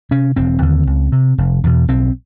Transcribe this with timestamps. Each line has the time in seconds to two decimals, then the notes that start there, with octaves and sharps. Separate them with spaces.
0.11 C3 C#4
0.36 E1 C4
0.62 D#2 D3
0.87 C#2
1.12 C3
1.38 F1
1.64 E2 B2
1.88 B1 C4